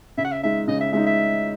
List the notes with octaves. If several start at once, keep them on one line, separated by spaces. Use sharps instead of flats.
C#3 E5
F#5
E5
G#3 D#4 E5
C#3 D#5
E5
G#3 D#4 E5
E5